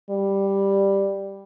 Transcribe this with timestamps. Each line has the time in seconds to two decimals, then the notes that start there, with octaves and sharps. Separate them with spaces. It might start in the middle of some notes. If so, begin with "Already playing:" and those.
0.10 G3